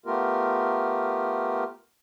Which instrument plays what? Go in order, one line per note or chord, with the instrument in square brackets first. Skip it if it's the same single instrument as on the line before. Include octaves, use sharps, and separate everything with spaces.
[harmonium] A3 B3 F4 G4 A#4